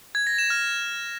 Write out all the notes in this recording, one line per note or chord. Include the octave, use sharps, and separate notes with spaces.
G#6
A#6
E7
F6